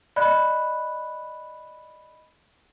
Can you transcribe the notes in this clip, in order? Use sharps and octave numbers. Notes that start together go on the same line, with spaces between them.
D5 D#5 B5 F#6